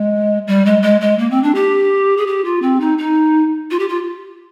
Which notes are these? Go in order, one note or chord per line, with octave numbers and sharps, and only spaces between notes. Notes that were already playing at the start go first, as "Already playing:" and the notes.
Already playing: G#3
G3
G#3
G#3
G#3
A#3
C4
D4
G4
G#4
G4
F4
C4
D#4
D#4
F4
G4
F4